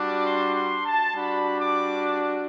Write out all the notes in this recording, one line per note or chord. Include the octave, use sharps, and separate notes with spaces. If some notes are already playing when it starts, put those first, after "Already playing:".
Already playing: G3 D4 F#4 D6
C6
C6
A5
G3 D4 F#4 B5
D6